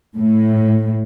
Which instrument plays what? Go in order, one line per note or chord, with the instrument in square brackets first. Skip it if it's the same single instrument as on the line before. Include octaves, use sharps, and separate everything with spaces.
[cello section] A2